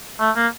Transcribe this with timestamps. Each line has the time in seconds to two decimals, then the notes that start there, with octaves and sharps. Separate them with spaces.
0.19 A3
0.36 A#3